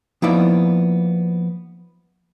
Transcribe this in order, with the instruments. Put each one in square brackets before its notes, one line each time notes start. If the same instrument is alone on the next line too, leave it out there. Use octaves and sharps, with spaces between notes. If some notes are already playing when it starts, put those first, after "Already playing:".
[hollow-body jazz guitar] F3 A#3 B3 D#4 E4 D5